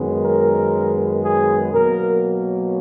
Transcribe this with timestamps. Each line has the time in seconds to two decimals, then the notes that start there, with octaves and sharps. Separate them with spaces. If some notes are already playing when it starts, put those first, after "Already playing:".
Already playing: F#2 D#3 G#3 B3
0.23 A#4
1.23 G#4
1.73 B2 F#3 A#3 A#4